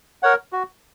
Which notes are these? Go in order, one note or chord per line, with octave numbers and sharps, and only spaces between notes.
A#4 C#5 F#5
F#4